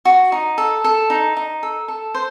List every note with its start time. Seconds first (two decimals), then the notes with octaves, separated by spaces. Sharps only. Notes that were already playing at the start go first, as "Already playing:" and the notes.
0.05 F#4
0.32 D#4
0.58 A4
0.84 A4
1.10 D#4
1.37 D#4
1.63 A4
1.88 A4
2.14 C5